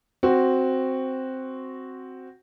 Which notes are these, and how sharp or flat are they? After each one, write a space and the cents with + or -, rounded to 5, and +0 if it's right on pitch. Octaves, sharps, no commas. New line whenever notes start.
C4 +0 F#4 +0